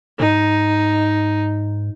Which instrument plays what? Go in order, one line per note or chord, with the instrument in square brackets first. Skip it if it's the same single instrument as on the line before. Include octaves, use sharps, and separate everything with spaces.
[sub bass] G#2 [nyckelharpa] D#4